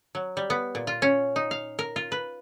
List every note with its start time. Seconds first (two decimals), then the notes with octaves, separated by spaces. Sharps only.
0.15 F#3
0.37 G3
0.50 B3
0.75 A#2
0.87 F4
1.02 C#4
1.36 D#4
1.51 F5
1.79 A#4
1.96 F4
2.12 B4